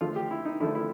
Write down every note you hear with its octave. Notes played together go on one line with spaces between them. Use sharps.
D3 F3 A3 F4
G4
E4
D#4
D3 F3 A3 E4
E4